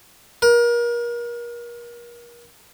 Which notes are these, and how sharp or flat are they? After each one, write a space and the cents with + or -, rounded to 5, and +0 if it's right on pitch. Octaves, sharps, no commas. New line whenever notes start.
A#4 +35